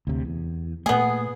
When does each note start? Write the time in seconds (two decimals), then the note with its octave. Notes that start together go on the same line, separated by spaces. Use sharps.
0.07 D2 C3
0.25 E2
0.86 A#2 A3 B3 G#4